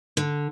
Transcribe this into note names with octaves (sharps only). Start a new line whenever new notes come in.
D3